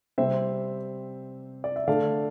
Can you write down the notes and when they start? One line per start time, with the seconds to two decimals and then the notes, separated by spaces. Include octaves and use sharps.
0.18 C3 G3 C4 C5 E5
1.64 D5
1.76 E5
1.88 D3 A3 D4 D5 F5